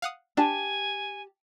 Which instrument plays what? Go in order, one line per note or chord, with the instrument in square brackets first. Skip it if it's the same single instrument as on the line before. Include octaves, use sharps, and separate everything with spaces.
[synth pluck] F5 F#5 D#6
[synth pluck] D4 [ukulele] G4 A5 [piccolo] G#5